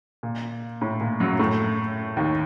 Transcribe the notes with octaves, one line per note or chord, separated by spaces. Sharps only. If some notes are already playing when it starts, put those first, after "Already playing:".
A#2
A2
A#2
F#2 F#3
A2 A3
D#2 D#3